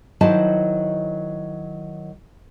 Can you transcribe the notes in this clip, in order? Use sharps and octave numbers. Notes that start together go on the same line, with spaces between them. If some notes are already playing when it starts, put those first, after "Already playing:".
D#3 F#3 E4 C5 D#5 A5